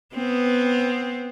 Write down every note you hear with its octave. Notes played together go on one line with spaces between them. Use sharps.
B3 C4